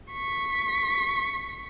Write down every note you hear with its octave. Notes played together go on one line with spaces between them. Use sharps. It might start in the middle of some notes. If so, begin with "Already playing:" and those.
C#6 B6